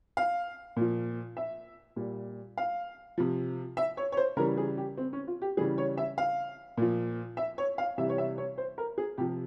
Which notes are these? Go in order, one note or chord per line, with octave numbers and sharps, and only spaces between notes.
F5
A#2 F3
E5
A#2 G3
F5
C3 F3
E5
C#5
C#5
C5
C#3 E3 G3 A#4
G#4
G4
C4
C#4
F4
G4
C#3 E3 G3 G#4
C#5
E5
F5
A#2 F3
E5
C#5
F5
C3 E3 G3 E5
C#5
E5
C#5
C5
A#4
G#4
C3 F3 G4